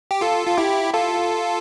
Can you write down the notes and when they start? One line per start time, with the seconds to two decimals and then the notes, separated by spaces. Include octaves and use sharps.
0.11 G4
0.21 F4 A4
0.47 F4
0.57 E4 G4
0.94 F4 A4